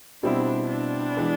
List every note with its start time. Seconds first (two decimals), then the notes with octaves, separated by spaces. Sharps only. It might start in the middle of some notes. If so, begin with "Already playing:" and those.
0.23 B2 G3 C4 D4 E4
0.69 D4
1.17 E3 G#3 B3